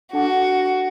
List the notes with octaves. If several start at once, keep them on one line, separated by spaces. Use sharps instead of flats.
D4 F#4 A4 F#5 A5 D6